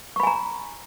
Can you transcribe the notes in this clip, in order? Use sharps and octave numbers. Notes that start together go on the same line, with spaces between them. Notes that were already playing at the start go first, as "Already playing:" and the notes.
G#5 A#5 B5 C#6